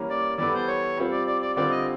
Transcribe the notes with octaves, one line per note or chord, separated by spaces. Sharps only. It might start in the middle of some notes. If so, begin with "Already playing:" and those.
Already playing: E3 G3 A#3 C#4
D5
E3 G3 B3 E4 A4 D5
C5
C#5
G3 C4 F4
D5
D5
D5
D3 G3 C4 F4 D5
D#5